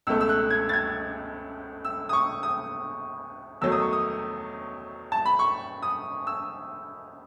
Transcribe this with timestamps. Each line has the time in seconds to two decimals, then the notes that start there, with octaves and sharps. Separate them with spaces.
0.07 C#2 B2 A3 E6
0.21 E6
0.29 F#6
0.50 G#6
0.69 A6
0.73 G#6
1.85 E6
2.09 D#6
2.13 C#6
2.43 D#6
3.61 E2 D#3 F#3 A3 E6
3.72 D#6
3.82 C#6
3.93 D#6
5.12 A5
5.26 B5
5.39 C#6
5.83 D#6
6.27 E6